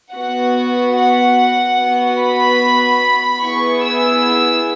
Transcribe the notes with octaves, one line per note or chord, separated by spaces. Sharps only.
B3 F#4 F#5
F#5
B3 F#4
B5
B3 E4 G#4 C#6
E6